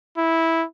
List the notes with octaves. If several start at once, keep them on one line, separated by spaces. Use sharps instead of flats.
E4